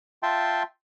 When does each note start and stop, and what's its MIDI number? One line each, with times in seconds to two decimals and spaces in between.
0.23 0.63 65
0.23 0.63 76
0.23 0.63 79
0.23 0.63 81
0.23 0.63 84